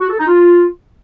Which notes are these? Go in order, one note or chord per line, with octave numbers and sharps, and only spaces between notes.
F#4
A4
D#4
F4